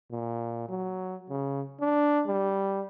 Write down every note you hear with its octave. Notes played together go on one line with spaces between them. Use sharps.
A#2
F#3
C#3
D4
G3